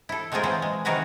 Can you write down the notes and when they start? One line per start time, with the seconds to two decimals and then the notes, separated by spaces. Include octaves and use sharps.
0.09 E4 A4
0.32 G#3 A3 C4 F4 G#4 A#4
0.43 A#2 E3 F#3 F4 C5
0.62 G#3
0.85 C3 D#3 F#4 G#4 A#4 B4